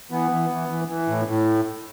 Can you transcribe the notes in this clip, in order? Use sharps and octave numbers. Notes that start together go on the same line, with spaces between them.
E3 B3
E3
E3
E3
E3
A2
A2